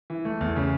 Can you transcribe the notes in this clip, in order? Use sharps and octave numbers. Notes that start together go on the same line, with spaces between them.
E3
A3
E2
C#3